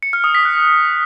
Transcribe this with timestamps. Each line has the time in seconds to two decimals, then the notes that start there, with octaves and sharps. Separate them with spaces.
0.03 C#7
0.13 F6
0.24 D#6
0.35 B6
0.45 F#6